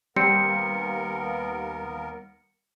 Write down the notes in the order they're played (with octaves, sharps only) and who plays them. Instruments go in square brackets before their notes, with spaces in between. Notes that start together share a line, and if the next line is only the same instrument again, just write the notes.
[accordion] D#2 B3 A#4 [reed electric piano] G3 [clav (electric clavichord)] C4 [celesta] C#7